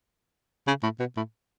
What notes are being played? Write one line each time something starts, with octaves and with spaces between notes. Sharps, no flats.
C#3
A2
B2
A2